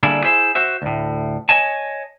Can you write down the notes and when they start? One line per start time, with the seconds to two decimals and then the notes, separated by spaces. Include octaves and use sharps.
0.03 D3 G3 A#3 D4 E4 G#4
0.23 E4 G#4 C5 E5
0.55 F#4 C5 E5
0.82 D2 A2
1.49 C#5 D#5 G#5 A5